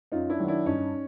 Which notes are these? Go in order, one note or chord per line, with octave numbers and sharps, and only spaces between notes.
F#2 D#4 F4
D4 E4
D#3 F#3
D4 E4
G2 C#4 D#4